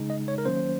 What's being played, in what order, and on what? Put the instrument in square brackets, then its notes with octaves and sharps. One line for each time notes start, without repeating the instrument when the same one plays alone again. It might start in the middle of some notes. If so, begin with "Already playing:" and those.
Already playing: [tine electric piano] C#3 G#3 D#4
D#5
C#5
A#4
D#3 F#3 A#3 C#4 C5